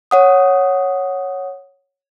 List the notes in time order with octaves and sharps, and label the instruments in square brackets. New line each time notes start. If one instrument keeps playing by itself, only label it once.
[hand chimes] C#5 F#5 D#6